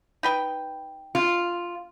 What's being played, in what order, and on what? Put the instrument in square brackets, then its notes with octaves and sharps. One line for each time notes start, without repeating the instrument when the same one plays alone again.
[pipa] D#4 B4 G5
[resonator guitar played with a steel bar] F4